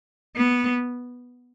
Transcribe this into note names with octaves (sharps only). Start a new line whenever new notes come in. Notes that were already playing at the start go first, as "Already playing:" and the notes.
B3